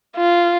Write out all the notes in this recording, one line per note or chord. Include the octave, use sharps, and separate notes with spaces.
F4